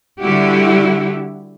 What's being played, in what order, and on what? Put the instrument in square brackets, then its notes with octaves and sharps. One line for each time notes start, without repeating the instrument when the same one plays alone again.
[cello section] D3 G3 E4 F#4 G4